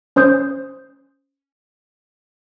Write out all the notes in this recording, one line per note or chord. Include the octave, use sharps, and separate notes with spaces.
C#4 C5 D#6 G6